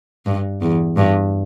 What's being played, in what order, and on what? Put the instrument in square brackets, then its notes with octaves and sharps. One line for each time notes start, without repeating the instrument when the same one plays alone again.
[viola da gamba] G2
E2
G2